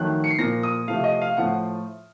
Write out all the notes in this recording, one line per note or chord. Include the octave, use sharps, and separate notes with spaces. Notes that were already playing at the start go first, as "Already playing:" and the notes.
Already playing: F2 D#3 F#3 A3 F#6
C#7
C7
A#2 F3 A#3 A#6
D#6
C3 F3 A3 F5
D#5
F5
A2 F3 A3 F#5